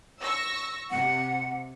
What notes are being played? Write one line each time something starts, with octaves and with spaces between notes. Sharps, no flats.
C#6 E6 A#6
C3 F#5